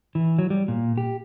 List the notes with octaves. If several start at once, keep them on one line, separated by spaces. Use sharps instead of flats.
E3
F#3
G3
A#2
G4